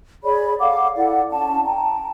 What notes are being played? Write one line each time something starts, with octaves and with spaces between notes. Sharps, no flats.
G#4 C#5 D5 B5
A4 F5 F#5 D6
E4 A4 D5 F#5
C#4 A5
G5 A5 A#5